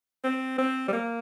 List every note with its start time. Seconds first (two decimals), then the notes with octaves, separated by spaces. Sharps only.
0.24 C4
0.59 C4
0.88 G3
0.93 A#3